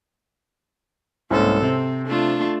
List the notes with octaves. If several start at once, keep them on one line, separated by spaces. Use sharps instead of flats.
C2 G#2 A#3 C#4 A4
C3 C4
A3 D4 F4